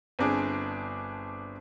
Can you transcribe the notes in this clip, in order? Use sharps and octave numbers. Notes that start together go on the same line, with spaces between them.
G1 C4 D4 G#4